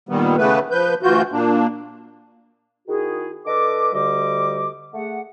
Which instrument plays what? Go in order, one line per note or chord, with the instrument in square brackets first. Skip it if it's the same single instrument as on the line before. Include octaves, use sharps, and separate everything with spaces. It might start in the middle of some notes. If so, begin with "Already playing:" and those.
[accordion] A#2 D#3 G3 B3
C#3 E3 A3 B3 B4
F3 B4 G6
D2 E3 F4 F#4 G6
A#2 A#3 D4
[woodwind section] D#3 E4 F#4 G#4
D3 A4 B4 D#5 D6
D2 D3 G3 G4 D#5 D6
A3 G#4 F#5